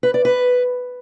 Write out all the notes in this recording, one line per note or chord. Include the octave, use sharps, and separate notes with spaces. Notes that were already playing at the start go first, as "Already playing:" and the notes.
B4
D5
B4